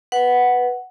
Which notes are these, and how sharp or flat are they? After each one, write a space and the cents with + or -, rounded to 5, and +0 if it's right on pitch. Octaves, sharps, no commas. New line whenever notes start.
B4 +0 F#5 +0